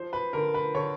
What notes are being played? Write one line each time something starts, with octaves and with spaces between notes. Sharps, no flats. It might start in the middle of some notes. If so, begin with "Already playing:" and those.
Already playing: F3 C5
B4
D3 A#4
B4
D3 C#5